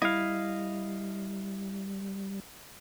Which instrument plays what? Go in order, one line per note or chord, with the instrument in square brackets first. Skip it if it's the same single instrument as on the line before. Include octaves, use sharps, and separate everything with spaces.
[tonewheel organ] G3 [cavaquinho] E4 [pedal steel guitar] D#5 F5